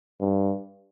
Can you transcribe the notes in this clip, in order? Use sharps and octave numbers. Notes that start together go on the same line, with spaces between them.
G2